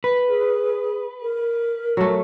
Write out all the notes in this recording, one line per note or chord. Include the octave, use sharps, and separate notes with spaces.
B4
G#4
A#4
F#3 A3